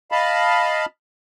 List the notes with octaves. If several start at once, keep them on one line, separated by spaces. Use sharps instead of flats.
D#5 F5 A5 B5